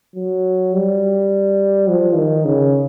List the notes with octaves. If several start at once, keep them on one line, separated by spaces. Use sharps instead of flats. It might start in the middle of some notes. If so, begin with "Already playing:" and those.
F#3
G3
F3
D#3
C#3